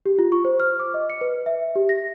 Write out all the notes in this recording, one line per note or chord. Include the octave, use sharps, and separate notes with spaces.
G4
F4
C#6
C5
F6
D6
D#5
C#7
B4
E5
G4
A#6